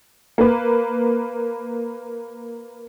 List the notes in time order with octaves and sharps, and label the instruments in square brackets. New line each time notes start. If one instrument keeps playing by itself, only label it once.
[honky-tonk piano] A#3 B4